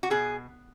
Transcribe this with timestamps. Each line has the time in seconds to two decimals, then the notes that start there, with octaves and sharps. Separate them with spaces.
0.03 F#4
0.10 B2 G#4